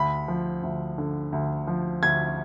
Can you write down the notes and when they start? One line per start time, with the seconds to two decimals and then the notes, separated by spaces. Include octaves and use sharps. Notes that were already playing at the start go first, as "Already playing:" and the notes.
Already playing: D2 B5
0.28 F3
0.63 D2
0.98 D3
1.32 D2
1.67 F3
2.03 D2 G#6